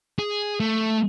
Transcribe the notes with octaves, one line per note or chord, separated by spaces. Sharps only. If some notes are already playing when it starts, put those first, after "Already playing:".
G#4
A3